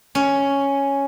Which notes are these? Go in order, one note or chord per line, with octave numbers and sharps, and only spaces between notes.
C#4